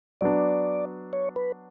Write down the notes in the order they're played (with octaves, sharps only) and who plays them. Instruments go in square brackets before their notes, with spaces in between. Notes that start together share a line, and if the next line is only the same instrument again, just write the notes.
[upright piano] F#3 B3 D4 [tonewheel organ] D5
[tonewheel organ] C#5
B4